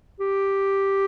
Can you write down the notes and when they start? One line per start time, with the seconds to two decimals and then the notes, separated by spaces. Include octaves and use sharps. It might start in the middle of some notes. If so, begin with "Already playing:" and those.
0.20 G4